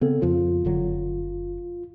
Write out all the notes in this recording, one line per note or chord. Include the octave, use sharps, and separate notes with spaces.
C#3 B3 C4 A4
F2 C#3 F3 F4
F#1 D3 F#3